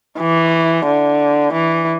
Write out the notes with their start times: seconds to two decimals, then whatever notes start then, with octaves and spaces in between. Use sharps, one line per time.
0.20 E3
0.87 D3
1.53 E3